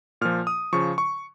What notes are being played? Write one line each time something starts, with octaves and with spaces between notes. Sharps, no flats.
A#2 F3 F6
D#6
C#3 F3 C#6
C#6